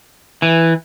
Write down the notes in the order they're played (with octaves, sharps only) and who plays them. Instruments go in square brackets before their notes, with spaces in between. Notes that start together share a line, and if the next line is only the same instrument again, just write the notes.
[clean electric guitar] E3